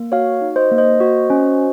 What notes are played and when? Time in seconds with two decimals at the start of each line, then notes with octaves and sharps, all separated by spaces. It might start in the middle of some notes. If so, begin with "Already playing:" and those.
Already playing: A#3
0.12 F#4 C#5 F5
0.41 D#4
0.56 C5 D#5
0.72 A#3
0.78 C5 D#5
1.00 F#4
1.30 C#4